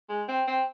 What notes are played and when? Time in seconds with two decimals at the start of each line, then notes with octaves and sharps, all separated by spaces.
0.09 G#3
0.28 C4
0.47 C4